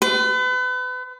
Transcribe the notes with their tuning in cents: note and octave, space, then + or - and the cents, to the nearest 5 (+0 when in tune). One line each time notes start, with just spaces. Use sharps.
B4 +35